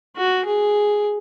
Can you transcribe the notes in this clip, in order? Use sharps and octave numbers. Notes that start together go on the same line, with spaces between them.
F#4
G#4